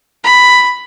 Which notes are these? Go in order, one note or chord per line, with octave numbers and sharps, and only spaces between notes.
B5